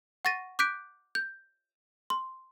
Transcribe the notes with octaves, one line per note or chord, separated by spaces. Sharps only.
F#5 C#6 A6 A#6 D#7
D6 F#6 G6 B6 D7
G6
C6